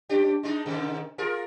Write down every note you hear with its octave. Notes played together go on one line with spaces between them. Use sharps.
C#4 D4 G4
G#3 D4 D#4
G#2 C3 D#3
F4 G#4 A#4